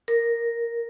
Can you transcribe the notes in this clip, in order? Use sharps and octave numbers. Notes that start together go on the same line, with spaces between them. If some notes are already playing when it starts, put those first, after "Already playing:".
A#4